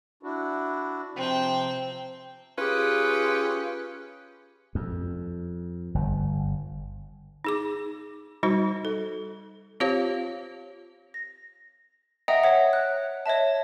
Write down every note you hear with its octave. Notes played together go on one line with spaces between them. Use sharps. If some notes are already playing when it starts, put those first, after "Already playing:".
D4 E4 F#4
C3 F3 C4 G5
C#4 F4 G4 G#4 B4
F2
G1
D#4 G#4 D6
G3 D#4 F#4 C5
A4
C4 F4 G4 C5 C#5 F5
A#6
D#5 E5 F#5 G5 A#5 D#6
C#5 E5 F#5
F#6
C#5 D#5 E5 A5